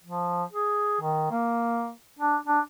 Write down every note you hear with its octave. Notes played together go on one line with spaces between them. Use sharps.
F3
G#4
D#3
A#3
D4
D4